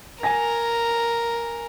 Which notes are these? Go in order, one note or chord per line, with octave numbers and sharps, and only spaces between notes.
A#4 G#5 A#6